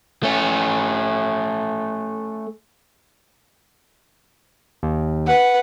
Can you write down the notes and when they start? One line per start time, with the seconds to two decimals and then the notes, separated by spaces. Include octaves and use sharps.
0.23 A3 C#4
4.83 D#2
5.27 B4 F#5